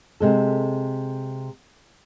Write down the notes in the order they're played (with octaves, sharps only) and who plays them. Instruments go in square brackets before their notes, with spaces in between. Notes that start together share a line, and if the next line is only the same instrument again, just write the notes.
[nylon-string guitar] C3 G#3 A4